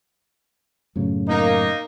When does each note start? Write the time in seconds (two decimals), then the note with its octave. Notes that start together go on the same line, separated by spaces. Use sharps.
0.96 F#2 A2 C#3
1.29 A#3 D#4